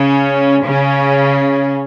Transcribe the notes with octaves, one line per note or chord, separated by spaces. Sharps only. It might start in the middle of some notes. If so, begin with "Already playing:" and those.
Already playing: C#3 C#4
C#3 C#4